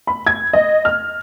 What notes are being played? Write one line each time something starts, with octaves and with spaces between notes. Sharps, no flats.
B5
G#6
D#5
F6